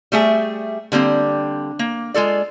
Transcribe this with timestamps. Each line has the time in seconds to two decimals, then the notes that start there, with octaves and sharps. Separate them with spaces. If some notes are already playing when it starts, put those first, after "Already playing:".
0.12 G3 A3 G#4 E5
0.92 D3 G3 A#3 C4
1.79 A#3
2.14 G#3 F4 A4 D5